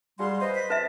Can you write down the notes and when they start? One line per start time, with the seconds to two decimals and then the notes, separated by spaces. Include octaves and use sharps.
0.19 G3 F#4 G#4 F5 C6
0.41 B4 C5 D#5
0.55 B6
0.70 B4 E5 A5